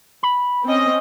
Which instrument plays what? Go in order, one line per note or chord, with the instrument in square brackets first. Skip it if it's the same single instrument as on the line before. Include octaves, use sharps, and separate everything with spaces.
[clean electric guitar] B5
[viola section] C4 C#4 D#5